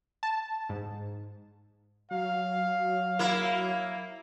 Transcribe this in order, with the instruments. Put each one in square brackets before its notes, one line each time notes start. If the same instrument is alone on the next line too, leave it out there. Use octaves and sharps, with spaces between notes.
[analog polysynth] A5
G#2
[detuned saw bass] F#3 [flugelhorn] F5
[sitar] A#3 E4